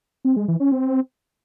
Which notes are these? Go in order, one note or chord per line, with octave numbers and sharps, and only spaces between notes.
C4
G#3
E3
C#4
C4